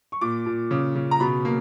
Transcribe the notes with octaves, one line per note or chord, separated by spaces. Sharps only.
C#6
A#2 D6
A#2
C#3
C#3
A#5
B2 B5
A#3